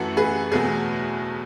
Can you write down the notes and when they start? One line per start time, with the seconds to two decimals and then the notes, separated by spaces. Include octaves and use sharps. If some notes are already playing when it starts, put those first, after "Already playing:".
Already playing: F#2 E3 A3 F#4 A4
0.17 G#4 B4
0.52 E2 B2 F#3 A3 G#4